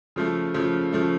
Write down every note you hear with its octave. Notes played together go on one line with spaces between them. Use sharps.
C#3 F3 A3
C#3 F3 A3
C#3 F3 A3